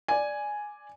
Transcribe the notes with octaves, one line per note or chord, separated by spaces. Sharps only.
D5 G#5